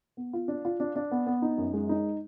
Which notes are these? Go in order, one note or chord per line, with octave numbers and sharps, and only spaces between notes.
B3
F4
D4
F4
D4
D4
B3
B3
D#4
F#2
G#3
D#4